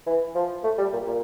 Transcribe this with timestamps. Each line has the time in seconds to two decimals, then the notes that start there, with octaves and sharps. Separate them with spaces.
0.06 E3
0.35 F3
0.64 A3
0.78 G3
0.92 A#2
1.07 A#2